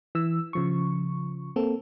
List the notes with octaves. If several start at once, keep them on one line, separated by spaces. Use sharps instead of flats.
E3 E6
C#3 F3 C#6
A#3 C4 A4